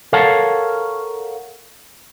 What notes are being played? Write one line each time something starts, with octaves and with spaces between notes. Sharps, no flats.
A4 A#4 C#5 F5 F#5 A5